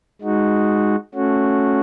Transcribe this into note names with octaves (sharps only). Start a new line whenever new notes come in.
G#3 D#4 F#4
A3 C#4 F#4